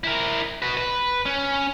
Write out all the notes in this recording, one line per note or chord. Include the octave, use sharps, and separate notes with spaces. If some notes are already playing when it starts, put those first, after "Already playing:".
E4 A#4
F#4 B4
B4
C#4